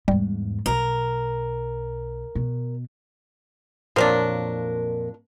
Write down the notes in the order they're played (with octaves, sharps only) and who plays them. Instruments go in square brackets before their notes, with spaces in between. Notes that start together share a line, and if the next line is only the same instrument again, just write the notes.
[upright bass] E2 G#2 [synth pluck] G3
[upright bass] B1 [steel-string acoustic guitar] A#4
[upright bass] B2
[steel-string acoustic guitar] F2 A#2 A#4 [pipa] F3 F#3 D4